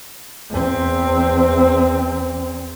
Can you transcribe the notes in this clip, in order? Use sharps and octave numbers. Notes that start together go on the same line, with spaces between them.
E2 C4